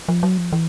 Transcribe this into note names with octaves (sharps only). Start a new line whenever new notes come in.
F3
F#3
F3
E3